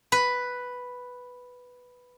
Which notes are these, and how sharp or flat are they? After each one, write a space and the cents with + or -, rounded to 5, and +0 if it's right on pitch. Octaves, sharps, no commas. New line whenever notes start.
B4 +0